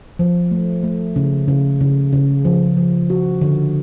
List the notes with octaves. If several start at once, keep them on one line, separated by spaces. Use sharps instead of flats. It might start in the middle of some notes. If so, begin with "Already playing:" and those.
F3
A3
A3
C#3
C#3
C#3
C#3
F3
F3
F#4
D3